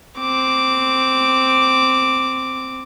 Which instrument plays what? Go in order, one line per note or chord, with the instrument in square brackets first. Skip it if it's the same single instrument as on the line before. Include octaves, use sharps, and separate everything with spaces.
[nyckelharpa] C4 D6